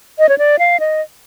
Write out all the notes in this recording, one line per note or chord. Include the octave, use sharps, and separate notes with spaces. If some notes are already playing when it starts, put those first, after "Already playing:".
D#5
C#5
D5
F5
D#5